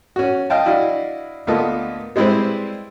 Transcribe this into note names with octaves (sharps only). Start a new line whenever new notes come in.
C#4 F#4
D#5 F5 G5 A5
D4 E4 F#4 D#5 F5
D2 A#3 B3 F4 A4 D#5
G3 G#3 C4 E4 B4 C5